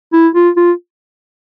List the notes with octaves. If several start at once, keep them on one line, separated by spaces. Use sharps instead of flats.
E4
F4
F4